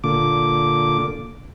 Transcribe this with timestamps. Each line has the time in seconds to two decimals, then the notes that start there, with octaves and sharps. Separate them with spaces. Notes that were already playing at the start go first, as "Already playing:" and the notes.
0.04 A#2 D3 D6